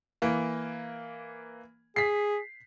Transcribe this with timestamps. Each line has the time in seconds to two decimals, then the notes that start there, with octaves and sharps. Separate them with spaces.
0.22 E3 A#3
1.96 G#4 B6 C7